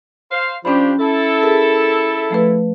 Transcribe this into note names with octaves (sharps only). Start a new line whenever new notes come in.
C5 F5
F3 C#4 D4 G4 B5
E4 A4
G#4 A#4
F3 A3 B4